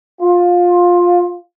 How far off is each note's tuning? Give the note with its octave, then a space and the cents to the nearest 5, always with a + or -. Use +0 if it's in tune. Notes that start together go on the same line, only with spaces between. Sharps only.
F4 +15